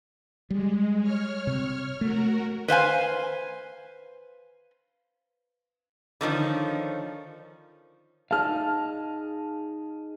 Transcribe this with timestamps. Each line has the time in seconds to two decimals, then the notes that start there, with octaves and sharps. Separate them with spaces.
0.50 G3 G#3
1.01 C#5 F6
1.47 C3
2.01 A3 F#4 A#4
2.68 B4 C5 F5 G#5
6.21 D3 D#3 F3 C#4
8.31 D#4 G#4 F5 A5 F6